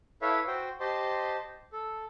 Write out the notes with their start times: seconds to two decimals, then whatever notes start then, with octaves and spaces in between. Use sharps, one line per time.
0.22 E4 A4 B4 C#5 E5 F5
0.47 F#4 C5 G5
0.80 G4 C5 D#5 A5 C6
1.73 A4